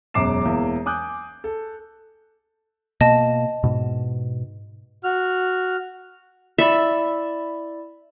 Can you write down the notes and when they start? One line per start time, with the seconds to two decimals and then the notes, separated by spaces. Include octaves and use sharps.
0.14 E1 F#2 B2 D6 C7 E7
0.45 E1 E2 A#3 E5
0.86 G#5 D6 D#6 F#6 G6
1.44 A4
3.01 B2 A#3 D#5 A5
3.64 G#2 B2
5.04 F#4 F6
6.58 E4 D5 E5 B5